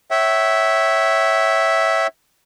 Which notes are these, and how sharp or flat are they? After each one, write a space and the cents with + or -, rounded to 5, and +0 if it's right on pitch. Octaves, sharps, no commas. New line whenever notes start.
C#5 -10 E5 -5 G5 -45